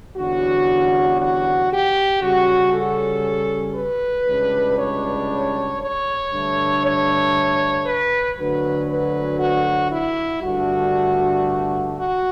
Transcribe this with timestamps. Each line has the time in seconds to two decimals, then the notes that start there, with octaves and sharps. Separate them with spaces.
0.17 E2 D3 G3 C#4 F#4
1.19 F#4
1.71 G4
2.22 C#3 G3 C#4 F#4
2.73 A4
3.75 B4
4.27 C#2 C#3 G3 D4
4.78 C#5
5.81 C#5
6.32 G2 D3 A3 D4
6.83 C#5
7.85 B4
8.37 D2 D3 F#3 B4
8.88 B4
9.39 F#4
9.90 E4
10.42 G2 D3 A3 D4 F#4
11.95 F#4